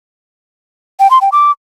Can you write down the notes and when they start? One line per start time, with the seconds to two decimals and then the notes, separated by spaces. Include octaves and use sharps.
1.00 G5
1.11 C6
1.21 G5
1.32 D6